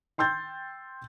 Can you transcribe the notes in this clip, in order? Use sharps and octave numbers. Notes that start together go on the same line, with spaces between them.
G5 C6 E6 G6 A6